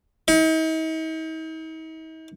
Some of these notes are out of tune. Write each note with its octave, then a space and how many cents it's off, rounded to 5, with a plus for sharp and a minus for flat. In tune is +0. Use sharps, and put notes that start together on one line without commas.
D#4 +45